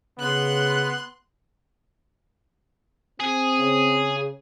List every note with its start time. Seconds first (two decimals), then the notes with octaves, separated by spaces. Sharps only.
0.19 C#3 B3 C6 F#6
3.20 C4 G#4
3.59 C#3